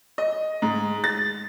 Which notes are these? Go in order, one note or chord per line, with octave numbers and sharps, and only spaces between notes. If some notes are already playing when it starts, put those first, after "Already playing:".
D#5
G#2
A6